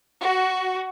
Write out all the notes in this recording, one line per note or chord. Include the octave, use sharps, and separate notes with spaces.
F#4